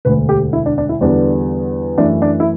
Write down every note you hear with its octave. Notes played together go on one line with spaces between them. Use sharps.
E1 D2 D3 B4
G4
E4
D4
D4
E4
E2 D3 G3 B3 D4
F#2 E3 A3 D4
D4
E4